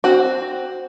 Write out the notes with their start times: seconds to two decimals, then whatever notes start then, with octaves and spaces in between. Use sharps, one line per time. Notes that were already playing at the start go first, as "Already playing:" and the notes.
0.04 C4 F#4